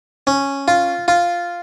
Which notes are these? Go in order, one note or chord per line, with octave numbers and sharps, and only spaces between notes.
C#4
F4
F4